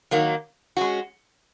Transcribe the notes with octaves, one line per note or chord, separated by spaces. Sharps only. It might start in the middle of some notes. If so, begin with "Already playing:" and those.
D#3 F#3 A#3
G#3 C#4 F#4